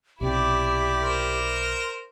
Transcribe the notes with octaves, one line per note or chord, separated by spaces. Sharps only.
B1 C3 E4 G4 D5
A#4 C5